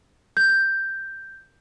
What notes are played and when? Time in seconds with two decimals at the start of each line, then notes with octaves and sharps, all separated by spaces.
0.37 G6